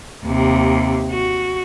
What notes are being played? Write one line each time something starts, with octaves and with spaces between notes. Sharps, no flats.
D#2 C3
F#4